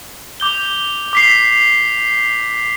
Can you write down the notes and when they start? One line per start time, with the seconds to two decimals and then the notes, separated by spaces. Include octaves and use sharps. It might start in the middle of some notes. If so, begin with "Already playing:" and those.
0.40 D6 G6 G7
1.13 D6 B6 C7